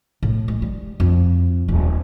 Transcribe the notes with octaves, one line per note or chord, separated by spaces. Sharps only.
A2
G#3
G3
F2
D#1